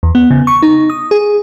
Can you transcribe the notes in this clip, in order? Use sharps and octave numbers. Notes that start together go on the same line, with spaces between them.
E2
B3
C#3
C#6
D#4
D#6
G#4